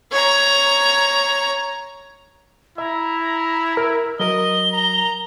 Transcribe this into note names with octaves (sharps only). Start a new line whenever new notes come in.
C#5 A#5
E4 E5 A#5
A#4
F#3 A#4 D#5 G7
A#5